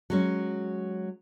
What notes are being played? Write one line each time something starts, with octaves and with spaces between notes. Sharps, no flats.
F#3 G#3 C#4